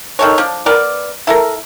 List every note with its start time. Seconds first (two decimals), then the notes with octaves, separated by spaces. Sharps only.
0.19 D#3 A4 C#5
0.38 F3 D4
0.66 B3 A#4 D5
1.27 E4 A4 A#4